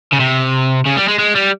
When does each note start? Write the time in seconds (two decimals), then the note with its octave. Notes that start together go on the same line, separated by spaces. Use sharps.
0.12 C#3
0.20 C3
0.86 C#3
0.97 G3
1.08 G#3
1.19 G#3
1.35 G3